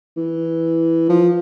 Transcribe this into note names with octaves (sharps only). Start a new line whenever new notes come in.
E3
F3